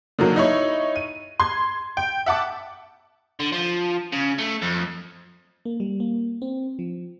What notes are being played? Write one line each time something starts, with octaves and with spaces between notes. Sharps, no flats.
D3 D#3 F#3 A#3
D#4 E4 C#5
D#7
C6 G#6
G5
E5 F#5 A5 D6
D3
F3
C#3
A3
F2
A#3
G3
A#3
C4
F3